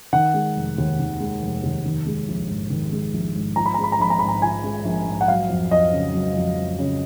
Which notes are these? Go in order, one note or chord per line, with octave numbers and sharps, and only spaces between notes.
D#3 F#5
G#3
F1
D#2
D#3
G#3
F1
D#2
D#3
G#3
A#1
G#2
D#3
G#3
A#1
G#2
F3 A#5
B5
G#3 A#5
B5
A#5
A#1 B5
A#5
G#2 B5
A#5
F3 G#5
G#3
A#1
G#2
F#5
F#3 F5
F2
F2 D#5
C#3
F#3
F2
F2
C#3